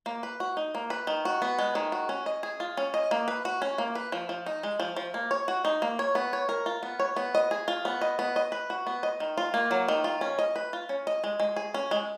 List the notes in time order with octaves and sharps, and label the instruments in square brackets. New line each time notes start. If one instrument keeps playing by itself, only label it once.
[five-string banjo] A#3
B4
F#4
D#4
A#3
B4
D#3
F#4
B3
G#3
D#3
F#4
C#4
D#5
G#4
F4
C#4
D#5
A#3
B4
F#4
C#4
A#3
B4
F3
F3
D#4
G#3
F3
F3
A#3
C#5
F#4
D#4
A#3
C#5
B3
C#5
A#4
F4
B3
C#5
B3
D#5
G#4
F4
B3
D#5
B3
D#5
B4
F#4
B3
D#5
D#3
F4
A#3
F#3
D#3
F4
C#4
D#5
B4
F4
C#4
D#5
G#3
G#3
G#4
C#4
G#3